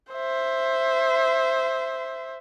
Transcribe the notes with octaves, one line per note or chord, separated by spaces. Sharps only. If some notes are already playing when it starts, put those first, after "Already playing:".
C5 E5